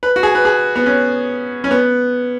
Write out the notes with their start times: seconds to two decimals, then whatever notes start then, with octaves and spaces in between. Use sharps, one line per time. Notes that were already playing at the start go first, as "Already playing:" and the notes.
0.03 B4
0.16 F#4
0.23 G#4
0.35 B4
0.45 G#4
0.76 B3
0.86 C#4
1.64 C#4
1.71 B3